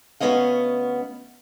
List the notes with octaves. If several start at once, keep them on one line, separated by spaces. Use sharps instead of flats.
D2 B2 B3 C#4 D#5 F5